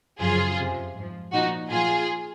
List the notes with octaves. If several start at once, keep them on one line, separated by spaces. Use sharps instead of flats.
F#2 C#3 F3 F4 G#4
F2 C3 F3
G#2
F3
A#2 F3 D#4 F#4
A#2 F3 F4 G#4